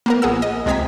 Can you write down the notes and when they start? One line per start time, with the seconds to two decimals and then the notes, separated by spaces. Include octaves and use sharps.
0.06 A#3 B3 A#4
0.22 A#1 G#4 F#5 E6
0.42 D#5
0.66 C#2 C3 G#3 A#5 G#6 B6